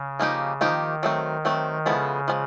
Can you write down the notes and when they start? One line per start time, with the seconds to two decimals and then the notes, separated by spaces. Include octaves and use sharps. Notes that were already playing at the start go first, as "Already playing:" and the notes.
Already playing: C#3
0.19 F3 A#3 D#4 G4
0.61 D#3 F3 A#3 D#4 G4
1.03 F#3 A3 C4
1.45 F#3 A3 C4
1.86 C#3 F3 G#3 B3 E4 A4
2.28 F3 G#3 B3